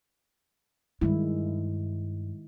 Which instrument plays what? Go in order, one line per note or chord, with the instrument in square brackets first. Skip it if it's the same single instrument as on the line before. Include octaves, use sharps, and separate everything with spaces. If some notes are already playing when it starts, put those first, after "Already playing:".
[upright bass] G2 [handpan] D#3 G#3 E4